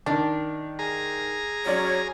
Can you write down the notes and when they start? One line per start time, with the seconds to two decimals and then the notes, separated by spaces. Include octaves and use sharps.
0.06 D#3 D4
0.79 G#4 A#5
1.66 F#3 C#4 C#5 D5